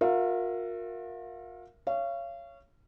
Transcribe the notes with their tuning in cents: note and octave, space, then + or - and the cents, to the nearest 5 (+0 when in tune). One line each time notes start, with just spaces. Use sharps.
F4 +45 A#4 +0 E5 +30
C#5 +0 F5 -35